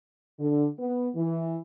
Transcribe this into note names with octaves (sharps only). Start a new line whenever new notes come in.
D3
B3
E3